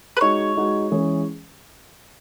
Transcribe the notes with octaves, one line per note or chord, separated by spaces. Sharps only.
B4
G#3 D#4 F#4 C#5
G#3 D#4 F#4
E3 G#3 C#4 G#4